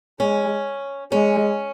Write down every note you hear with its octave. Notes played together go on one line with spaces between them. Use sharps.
G#3 C#4
G#3 C#4